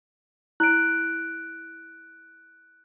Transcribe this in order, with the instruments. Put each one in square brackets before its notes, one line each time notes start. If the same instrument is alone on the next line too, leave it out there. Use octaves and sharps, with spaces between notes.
[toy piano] E4 [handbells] F#6 D7